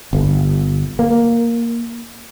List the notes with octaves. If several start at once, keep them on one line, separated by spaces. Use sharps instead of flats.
G1
A#3